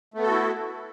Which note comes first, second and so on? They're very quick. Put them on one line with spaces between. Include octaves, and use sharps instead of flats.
A3 B3 A4 F#4 E4